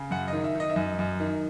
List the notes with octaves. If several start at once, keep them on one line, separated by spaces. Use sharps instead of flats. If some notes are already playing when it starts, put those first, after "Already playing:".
Already playing: C#3
F#2 F#5
D#3 D#5
E5
D#3
D#5
E5
F#2 D#5
F#2
D#3